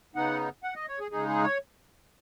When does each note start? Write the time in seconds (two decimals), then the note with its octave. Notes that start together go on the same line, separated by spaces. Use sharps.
0.15 C#3 B3 D#4 F#5
0.63 F#5
0.75 D#5
0.88 C#5
1.00 G#4
1.11 C#3 G#3 D#4 G#4
1.28 G#4
1.43 C#5